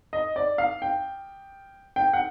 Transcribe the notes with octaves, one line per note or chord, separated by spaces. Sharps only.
D#5
D5
F5
G5
G5
F#5